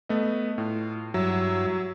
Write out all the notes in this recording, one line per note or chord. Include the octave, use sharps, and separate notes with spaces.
A3 B3 D#5
A2 F4
G2 F#3 E4 E5